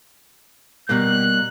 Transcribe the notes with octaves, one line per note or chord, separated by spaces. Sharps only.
B2 G3 A#3 F#6